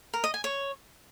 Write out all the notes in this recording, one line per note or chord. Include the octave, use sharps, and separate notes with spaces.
A#4
D#5
G#5
C#5